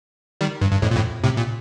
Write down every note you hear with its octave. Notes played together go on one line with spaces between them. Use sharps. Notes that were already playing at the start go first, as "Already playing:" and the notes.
D#3 G3
G2
G2
F2 A2
A#2
F2 A2
A2 C3
A#2